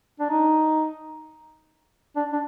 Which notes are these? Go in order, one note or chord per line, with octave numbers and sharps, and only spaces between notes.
D4
D#4
D4
D4